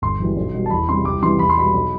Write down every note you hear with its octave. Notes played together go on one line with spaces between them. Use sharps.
G1 C6
F#2 E3 G3
B1
B2 G3
A5
E2 B5
C3 G3 C6
C2 D6
C3 E3 G3 C6
E2 B5
C6
B2 G3 B5
B1